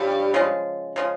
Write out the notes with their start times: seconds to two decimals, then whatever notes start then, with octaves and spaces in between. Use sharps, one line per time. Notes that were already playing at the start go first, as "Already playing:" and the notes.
Already playing: G2 C#3 F3 G3 G#3
0.34 C#3 F3 G#3
0.96 C#3 F3 G#3